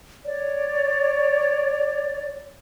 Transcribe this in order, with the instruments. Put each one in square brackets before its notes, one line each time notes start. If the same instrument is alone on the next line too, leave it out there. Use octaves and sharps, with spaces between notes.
[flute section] C#5 D5